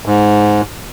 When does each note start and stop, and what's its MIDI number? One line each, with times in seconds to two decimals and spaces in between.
0.06 0.61 44